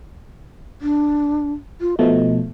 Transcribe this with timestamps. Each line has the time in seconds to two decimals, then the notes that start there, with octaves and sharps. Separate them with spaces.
0.81 D4
1.81 F4
1.99 B2 F3 A3 D#5